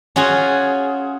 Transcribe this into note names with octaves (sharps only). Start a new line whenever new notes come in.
C#4 F4 F#4 G#4